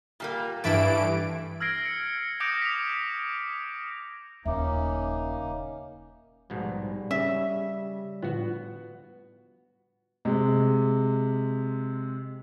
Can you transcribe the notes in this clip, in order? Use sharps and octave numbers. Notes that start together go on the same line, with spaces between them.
A#2 G3 A#3
G2 E3 A3 D4 E4 D7
E6 F6 G#6 A#6 C7 D7
C#7
D6 D#6 G6 A#6 C#7 D7
B6 F7
D#1 C#3 A#3 C#4 D#4 E5 D6
A#1 G#2 B2 G3
C#3 C#4 E5
A2 D3 F3 B3 F#4
C3 G#3